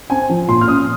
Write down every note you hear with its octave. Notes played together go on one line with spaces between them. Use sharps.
C4 G#5
F3
A#2 C6
F6
C#4 D#6